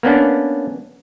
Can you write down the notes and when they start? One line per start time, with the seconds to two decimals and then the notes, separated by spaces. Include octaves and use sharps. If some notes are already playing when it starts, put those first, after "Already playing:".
0.03 A#3 B3 C#4 D4